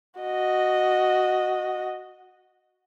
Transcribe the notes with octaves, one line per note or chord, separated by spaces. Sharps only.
F#4 D#5